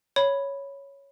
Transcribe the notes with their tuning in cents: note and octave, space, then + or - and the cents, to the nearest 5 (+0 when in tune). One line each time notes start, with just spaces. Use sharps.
C#5 +0 B5 +0